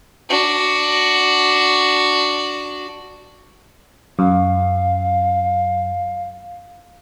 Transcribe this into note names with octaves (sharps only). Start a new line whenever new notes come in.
D4 F#4
F#2 F5